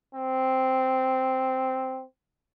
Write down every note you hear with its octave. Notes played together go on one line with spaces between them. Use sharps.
C4